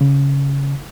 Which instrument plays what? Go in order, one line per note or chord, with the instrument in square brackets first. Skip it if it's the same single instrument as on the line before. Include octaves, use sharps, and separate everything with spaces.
[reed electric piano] C#3